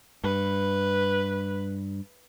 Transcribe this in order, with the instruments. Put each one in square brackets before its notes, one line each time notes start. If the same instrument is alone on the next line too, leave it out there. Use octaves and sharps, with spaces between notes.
[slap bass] G2 [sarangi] B4